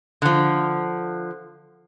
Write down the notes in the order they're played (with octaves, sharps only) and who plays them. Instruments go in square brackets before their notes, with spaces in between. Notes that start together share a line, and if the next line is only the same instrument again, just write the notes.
[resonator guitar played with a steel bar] D3 F3